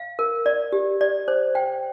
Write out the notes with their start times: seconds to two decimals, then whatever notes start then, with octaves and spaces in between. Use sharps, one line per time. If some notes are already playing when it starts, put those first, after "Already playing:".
Already playing: F5
0.19 A#4
0.46 D5
0.72 G4
1.01 D5
1.28 C5
1.55 G5